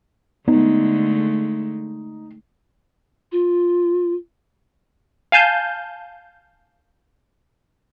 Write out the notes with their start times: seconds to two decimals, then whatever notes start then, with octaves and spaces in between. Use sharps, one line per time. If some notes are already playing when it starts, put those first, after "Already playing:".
0.48 D3 G#3 A3 B3 D#4
3.32 F4
5.32 F5 G#5 A5 G6